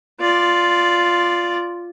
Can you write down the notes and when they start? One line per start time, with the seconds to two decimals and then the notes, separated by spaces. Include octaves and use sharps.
0.20 F4 D5